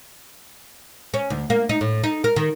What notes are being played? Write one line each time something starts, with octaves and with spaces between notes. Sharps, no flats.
C#4
D2
A#3
D#4
A2
D#4
A#4
D#3